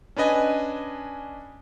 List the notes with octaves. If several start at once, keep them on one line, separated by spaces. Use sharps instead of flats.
C#4 D4 B4 D#5 G#5